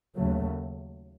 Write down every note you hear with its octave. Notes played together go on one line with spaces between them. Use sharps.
D#2 C#3 F#3 A3